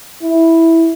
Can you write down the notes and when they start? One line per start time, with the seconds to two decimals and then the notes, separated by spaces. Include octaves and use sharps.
0.23 E4